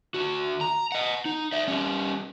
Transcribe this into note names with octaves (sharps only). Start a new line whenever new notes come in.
D2 F#4
A#5
D#5 F#5
D#4
D5 E5
G3 C#4